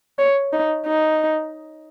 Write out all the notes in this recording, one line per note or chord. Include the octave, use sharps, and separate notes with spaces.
C#5
D#4
D#4